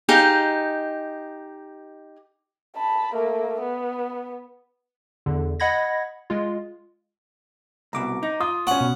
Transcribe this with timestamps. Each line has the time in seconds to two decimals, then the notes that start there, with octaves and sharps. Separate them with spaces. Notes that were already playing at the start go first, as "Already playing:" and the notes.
0.09 D#4 G4 G#4 F5
2.77 A5 B5
3.14 A3 A#3
3.61 B3
5.26 E2 D3
5.60 D#5 F#5 B5 G#6 A#6
6.30 G#3 F4
7.93 C2 B2 A#5 D6
8.23 D#4
8.41 F4 D#6
8.67 C#4 F#5 C#6
8.81 B2